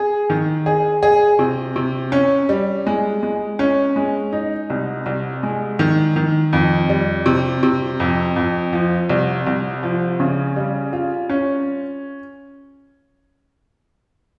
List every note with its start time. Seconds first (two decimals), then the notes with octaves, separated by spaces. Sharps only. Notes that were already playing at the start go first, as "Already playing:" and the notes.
Already playing: G#4
0.30 D#3
0.66 G#4
1.03 G#4
1.39 C3
1.76 C3
2.12 C#4
2.49 G3
2.87 G#3
3.23 G#3
3.59 C#4
3.96 G#3
4.33 D#4
4.70 C2
5.06 C2
5.43 G#3
5.79 D#3
6.16 D#3
6.53 F2
6.89 G3
7.26 C3
7.63 C3
8.00 F2
8.36 F2
8.73 F3
9.09 C2
9.47 C2
9.83 F3
10.20 C#3
10.56 G3
10.93 F4
11.30 C#4